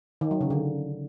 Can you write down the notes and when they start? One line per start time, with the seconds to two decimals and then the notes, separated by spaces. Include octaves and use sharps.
0.21 D#3
0.31 F#3
0.41 C#3
0.50 D3